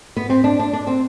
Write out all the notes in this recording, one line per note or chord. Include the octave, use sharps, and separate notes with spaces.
B3
C4
D4
D4
D4
C4